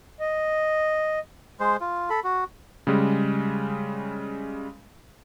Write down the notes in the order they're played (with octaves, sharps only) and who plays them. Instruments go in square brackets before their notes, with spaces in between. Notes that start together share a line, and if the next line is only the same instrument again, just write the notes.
[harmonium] D#5
[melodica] G#3 C5
F4
A4 B5
F#4
[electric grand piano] C#3 G3 G#3